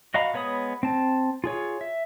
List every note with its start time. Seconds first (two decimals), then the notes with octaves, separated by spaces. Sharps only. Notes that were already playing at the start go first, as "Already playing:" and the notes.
0.14 F#4 D#5 F5 A#5 B5
0.34 G#3 B3 C#5 B5 D#6
0.83 C4 A5
1.44 F4 G#4 C#5
1.81 E5